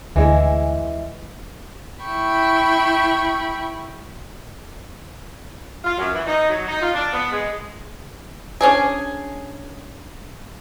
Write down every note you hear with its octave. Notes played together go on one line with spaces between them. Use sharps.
D2 E3 G#3 E4
E4 G5 B5 C#6
F4
F#2
E3
D#4
F#3
D#4
F4
D4
B3
G#3
C#4 D4 G#4